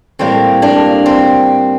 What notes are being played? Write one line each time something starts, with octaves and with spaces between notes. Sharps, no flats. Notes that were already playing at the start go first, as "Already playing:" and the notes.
A2 G3 A#3 C4
A#3 D4
C4